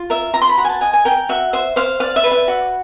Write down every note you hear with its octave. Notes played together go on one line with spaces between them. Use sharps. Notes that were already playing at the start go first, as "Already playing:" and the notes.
Already playing: F4
A#4 E5
F4 A#5
C6
B5
F#4 A#5
G#5
A5
D#5 G#5
G#5
A#4 G5
F#4 E5
C5 E5
C5 F5
D5 F5
E5
B4
E5
F#4